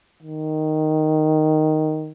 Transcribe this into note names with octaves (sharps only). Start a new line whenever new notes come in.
D#3